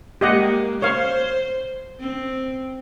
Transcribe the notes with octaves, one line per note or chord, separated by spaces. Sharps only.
G#3 A#3 G4 D#5 F#5
C5 C#5 F5
C4